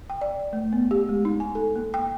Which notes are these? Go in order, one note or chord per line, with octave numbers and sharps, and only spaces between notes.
G5
D5
A3
B3
G4
G#3
D#4
G#5
A4
A#3
G5